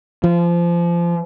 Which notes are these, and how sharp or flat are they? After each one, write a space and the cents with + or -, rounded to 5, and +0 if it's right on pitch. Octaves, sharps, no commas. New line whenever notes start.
F3 -25